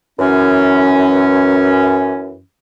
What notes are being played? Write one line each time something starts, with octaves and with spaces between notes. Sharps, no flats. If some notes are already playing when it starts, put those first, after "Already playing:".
F#2 E3 C#4